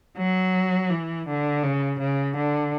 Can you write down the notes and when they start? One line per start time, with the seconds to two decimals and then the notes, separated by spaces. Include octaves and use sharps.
0.18 F#3
0.90 E3
1.27 D3
1.63 C#3
1.99 C#3
2.36 D3